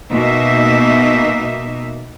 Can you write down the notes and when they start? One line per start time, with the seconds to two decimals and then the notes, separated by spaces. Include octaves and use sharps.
0.12 B2 A#3 D#4 E5